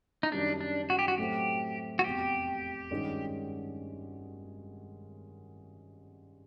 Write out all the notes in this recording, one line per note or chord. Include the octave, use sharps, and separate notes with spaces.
D#4
F#2 D#3 G3 D4
D4
F#4
G4
F#4
A2 F#3 A3 C4 G4
F#4
F1 E2 C3 G4
G#1 G2 D#3 G#3 C#4